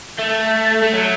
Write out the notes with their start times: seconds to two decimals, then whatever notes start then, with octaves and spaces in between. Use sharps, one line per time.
0.19 A3
0.83 A3
0.93 F#3